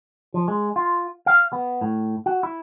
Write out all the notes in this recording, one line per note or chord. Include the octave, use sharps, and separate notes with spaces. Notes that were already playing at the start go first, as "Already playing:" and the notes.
F3
G#3
F4
F5
B3
A2
F#4
E4